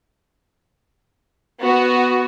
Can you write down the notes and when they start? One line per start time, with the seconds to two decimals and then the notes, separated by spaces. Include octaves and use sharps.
1.61 B3 F#4